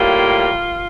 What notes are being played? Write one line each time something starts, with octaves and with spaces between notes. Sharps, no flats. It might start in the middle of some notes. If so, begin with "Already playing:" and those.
Already playing: A2 G3 A#3 F4